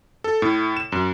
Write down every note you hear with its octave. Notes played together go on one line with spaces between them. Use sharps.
A4
A2
E7
F#2